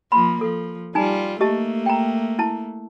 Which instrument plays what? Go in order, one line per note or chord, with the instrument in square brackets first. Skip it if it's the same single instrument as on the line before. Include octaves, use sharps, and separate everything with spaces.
[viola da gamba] F3 A#3 [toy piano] B5 C6
[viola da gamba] F3 [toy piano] A4
[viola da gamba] G3 F4 [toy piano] D#4 G#5 A#5
[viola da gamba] A3 A#3 [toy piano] G4 D#5 A5
[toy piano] G5 A#5
E4 A5